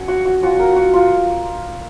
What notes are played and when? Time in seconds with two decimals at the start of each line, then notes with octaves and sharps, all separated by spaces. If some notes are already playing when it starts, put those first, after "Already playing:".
Already playing: F#3 C#4 C#5
0.08 F#4
0.25 F#4
0.42 F#3 C#4 F4 F#4
0.60 A#4
0.76 F#4
0.93 F4